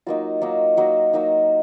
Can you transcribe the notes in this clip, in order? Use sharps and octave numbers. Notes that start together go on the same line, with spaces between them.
F#3 A#3 D#4 F4
F#3 A#3 D#4
F#3 A#3 D#4 F#4
F#3 A#3 D#4